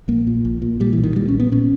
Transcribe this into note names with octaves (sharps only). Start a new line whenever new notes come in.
A#1 A#3
A#2
A#1
A#2
A#2 G3
E3
B1
D#3
A#2 G3
C#4
A#1
B3
A#2 C#4